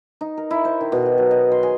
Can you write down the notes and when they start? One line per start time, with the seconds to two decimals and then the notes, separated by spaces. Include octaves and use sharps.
0.21 D#4
0.37 A#4
0.51 E4
0.65 C5
0.81 D#3
0.92 B2
1.05 G4
1.18 F#3
1.31 D#5
1.52 C6
1.63 G#4